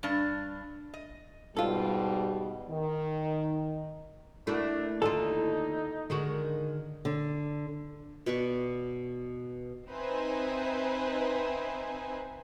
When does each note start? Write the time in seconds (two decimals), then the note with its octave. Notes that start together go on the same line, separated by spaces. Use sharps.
0.03 G2 D4
0.94 D#5
1.57 G#2 B2 G3 F4 A4
2.70 D#3
4.47 A3 A#3 D4 E4 F#4
5.02 D#2 D3 D#4 F4 A4
6.10 D3 D#3 G#3 F#4
7.05 D3
8.26 B2 B4 D5 C#6
9.89 C4 D#4 B4 C5 E5 G#5